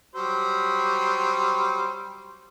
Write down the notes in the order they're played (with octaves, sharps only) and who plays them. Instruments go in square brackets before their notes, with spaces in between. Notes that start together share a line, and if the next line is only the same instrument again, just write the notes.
[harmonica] F#3 G3 C5